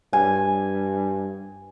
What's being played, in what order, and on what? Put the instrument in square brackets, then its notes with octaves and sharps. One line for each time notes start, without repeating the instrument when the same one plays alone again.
[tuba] G2 [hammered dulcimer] G#5